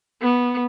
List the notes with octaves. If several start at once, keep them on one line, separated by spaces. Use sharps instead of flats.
B3